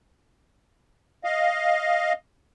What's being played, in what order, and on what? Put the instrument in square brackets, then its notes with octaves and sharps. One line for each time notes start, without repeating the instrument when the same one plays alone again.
[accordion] D#5 F5